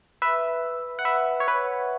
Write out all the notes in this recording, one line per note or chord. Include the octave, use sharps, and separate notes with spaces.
B4 E5
F#5
B4 E5
C#5
B4